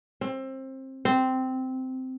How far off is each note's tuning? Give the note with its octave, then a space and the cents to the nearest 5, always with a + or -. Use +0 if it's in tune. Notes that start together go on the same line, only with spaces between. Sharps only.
C4 +25
C4 -10